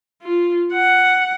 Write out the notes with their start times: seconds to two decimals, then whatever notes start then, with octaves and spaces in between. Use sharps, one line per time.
0.22 F4
0.73 F#5